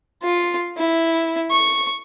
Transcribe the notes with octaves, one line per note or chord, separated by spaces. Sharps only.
F4
E4
C#6